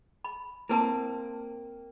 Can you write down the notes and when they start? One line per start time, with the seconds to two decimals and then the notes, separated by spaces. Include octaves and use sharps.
0.24 B5
0.69 A#3 C4 E4 B4 A5